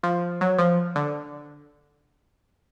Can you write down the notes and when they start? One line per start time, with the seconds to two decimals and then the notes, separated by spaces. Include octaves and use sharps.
0.03 F3
0.41 F#3
0.58 F3
0.96 D3